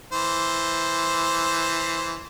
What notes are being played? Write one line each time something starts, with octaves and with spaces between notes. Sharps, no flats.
E3 C5